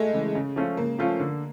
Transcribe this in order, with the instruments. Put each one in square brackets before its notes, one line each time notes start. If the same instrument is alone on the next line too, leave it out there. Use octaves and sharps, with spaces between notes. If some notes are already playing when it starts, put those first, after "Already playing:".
Already playing: [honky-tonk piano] G#3 A3
[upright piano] C#3 E3
C#3
F3 A3 C#4 F4
[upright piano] C#3 [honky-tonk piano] A#3
[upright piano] F3 A3 C#4 F4
D3